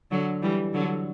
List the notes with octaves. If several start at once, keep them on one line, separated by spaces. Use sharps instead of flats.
D3 F#3
E3 G3
D3 F#3